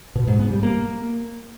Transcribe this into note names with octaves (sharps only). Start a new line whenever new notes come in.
B2
G#2
B3
G3
A#3